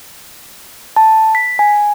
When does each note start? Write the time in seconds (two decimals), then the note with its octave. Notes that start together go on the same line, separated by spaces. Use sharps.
0.96 A5
1.35 B6
1.59 G#5